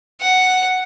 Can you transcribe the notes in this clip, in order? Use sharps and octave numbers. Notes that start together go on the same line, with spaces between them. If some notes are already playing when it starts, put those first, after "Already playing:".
F#5